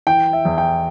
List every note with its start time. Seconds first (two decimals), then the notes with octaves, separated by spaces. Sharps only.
0.07 E3 G5
0.33 E5
0.45 E2
0.58 G5